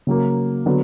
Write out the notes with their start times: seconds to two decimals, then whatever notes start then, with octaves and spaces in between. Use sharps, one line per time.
0.07 C#3 F#3 A#3
0.66 D3 F#3 B3